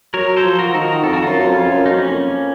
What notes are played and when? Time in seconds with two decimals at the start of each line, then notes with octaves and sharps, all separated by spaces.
0.14 F#3 A#4 C#5
0.37 A4 C5
0.43 F3
0.59 F#4 A#4
0.74 D#3 A4
0.81 F#4 A#4
1.03 F2 A4
1.13 F#4
1.22 F#2 F4 A4
1.40 F#2
1.48 F2 C#4 F4
1.70 F#2
1.86 D#4
1.93 F2 A#3 C#4